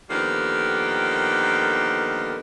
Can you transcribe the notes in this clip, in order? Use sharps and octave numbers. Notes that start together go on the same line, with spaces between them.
D3 D#3 F3 G3 A#3 B3